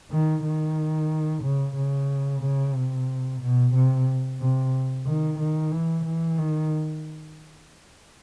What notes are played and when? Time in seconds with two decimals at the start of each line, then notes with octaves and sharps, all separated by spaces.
0.11 D#3
0.44 D#3
1.43 C#3
1.76 C#3
2.42 C#3
2.74 C3
3.41 B2
3.74 C3
4.39 C3
5.06 D#3
5.39 D#3
5.71 E3
6.05 E3
6.38 D#3